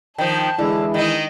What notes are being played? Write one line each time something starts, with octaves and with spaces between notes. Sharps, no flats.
D#3 F3 G5 A5
D3 E3 G#3 E4
D#3 D#4 D#5